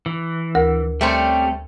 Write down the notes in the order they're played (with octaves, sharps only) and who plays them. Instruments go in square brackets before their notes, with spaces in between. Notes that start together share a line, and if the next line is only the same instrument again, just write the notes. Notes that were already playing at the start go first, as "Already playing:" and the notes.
[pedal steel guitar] E3
[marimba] D2 A#4 F#5
[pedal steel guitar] G3 [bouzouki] A3 C4 C#4